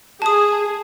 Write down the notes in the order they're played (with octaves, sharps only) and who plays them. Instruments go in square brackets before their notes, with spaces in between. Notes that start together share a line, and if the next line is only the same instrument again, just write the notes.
[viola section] G#4 [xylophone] A5 D#6